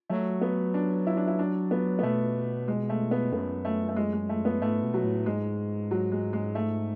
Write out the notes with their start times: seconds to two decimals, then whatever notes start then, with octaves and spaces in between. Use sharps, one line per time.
0.10 F#3 A3
0.41 B3
0.74 D4
1.07 E4
1.17 D4
1.27 E4
1.39 D4
1.71 B3
1.99 B3
2.03 B2 A3
2.68 G#3
2.89 A3
3.11 B3
3.32 F#2 B3
3.65 A3
3.89 A3
3.96 G#3
4.13 G#3
4.29 A3
4.45 B3
4.62 G#2 A3
4.84 B2
4.94 F#3
5.04 A2
5.26 G#2 G#3
5.91 F#3
6.12 G#3
6.33 G#3
6.55 A3